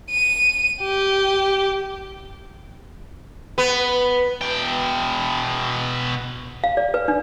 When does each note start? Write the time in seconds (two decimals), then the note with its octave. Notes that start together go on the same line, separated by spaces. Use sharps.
0.11 D#7
0.82 G4
3.58 B3
4.41 B2 G5
6.64 F5
6.77 D5
6.94 B4
7.08 D4